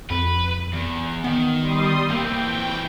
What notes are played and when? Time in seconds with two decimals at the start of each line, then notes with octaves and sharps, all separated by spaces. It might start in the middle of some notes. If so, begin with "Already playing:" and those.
0.10 F2 B4
0.73 E2
1.24 D#3 B3
1.61 G3 C6 D#6
2.10 E3 A#3 C4 G5